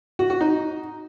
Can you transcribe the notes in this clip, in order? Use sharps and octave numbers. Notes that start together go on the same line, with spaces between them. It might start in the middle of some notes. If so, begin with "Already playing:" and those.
F#4
F#4
D#4